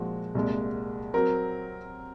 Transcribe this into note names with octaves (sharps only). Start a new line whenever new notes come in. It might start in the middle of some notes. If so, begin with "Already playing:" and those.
Already playing: A#2 F3 G#3 C4 F#4
C2 A#2 G#3
F#3 C4 A#4